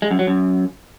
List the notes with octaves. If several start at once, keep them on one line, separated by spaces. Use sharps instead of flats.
G#3
F#2
F#3
F#2